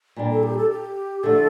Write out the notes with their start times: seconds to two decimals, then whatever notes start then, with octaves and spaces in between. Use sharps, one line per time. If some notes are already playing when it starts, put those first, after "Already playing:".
0.16 A#2 G3 D4
0.30 A4
0.43 G4
0.57 A4
0.70 G4
1.23 D3 F3 A3 D4 A4